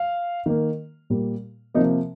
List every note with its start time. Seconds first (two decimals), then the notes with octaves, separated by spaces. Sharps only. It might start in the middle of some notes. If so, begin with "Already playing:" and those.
Already playing: F5
0.46 D#3 A#3
1.10 A#2 G3 A#3
1.74 C3 F3 A#3 D#4